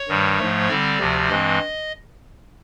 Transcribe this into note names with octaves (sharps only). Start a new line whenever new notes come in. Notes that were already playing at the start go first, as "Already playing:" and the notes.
Already playing: C#5
G2 D#3 G3
G#2 F3 A3
D3 G3 C4 D5
D2 C3 F3
G2 E3 G#3 C4 D#5